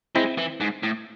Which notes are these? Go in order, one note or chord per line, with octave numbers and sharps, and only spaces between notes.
G#3 C4 E4
E3
G#2
A2